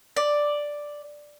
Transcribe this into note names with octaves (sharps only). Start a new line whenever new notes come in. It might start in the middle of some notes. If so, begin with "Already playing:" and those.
D5